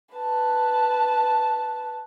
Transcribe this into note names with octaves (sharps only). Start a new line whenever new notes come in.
B4 A5